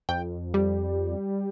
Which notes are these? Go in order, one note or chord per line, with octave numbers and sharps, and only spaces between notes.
F2 G5
G3